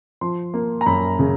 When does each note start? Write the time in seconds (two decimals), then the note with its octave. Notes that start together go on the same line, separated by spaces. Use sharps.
0.21 F3 C6
0.54 A#3
0.81 A#5
0.86 F#2 B5
1.19 C#3